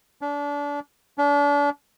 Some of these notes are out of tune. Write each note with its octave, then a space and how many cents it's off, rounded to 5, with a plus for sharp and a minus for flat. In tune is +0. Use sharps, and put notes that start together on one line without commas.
D4 -30
D4 -35